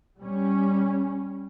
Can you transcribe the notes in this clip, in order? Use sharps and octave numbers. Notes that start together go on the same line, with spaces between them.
G3 C#4